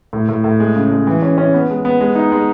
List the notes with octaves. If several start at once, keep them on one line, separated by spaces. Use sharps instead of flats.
A2
A2
A2
G#3
C#3
G#3
E3
C#4
C#4
B3
G#3
B3
G#3
D#4
G#3